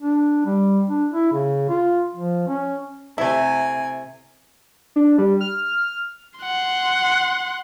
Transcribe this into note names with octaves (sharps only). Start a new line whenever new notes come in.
D4
G3
D4
E4
C#3
F4
F3
C#4
C3 A3 E4 G#5
D4
G3
F6
F#5 C6